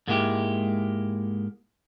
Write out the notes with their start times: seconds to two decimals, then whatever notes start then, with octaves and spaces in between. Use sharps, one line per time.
0.08 G#2 G#3 A#3 E4 F#4 G4